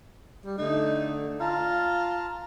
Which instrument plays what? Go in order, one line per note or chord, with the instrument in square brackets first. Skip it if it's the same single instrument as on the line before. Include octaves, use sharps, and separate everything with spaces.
[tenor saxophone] G3
[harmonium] D3 A3 [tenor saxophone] D#4
[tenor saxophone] F4 [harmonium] A5 A#5